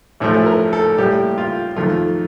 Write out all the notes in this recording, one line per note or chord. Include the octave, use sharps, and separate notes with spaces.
A1 A2 F3 A3
A#4
A4
A2 G3 A#3 G4
F4
F2 D#3 A3 F4